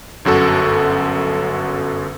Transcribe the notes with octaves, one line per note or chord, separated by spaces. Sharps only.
G1 F#2 F#4 A4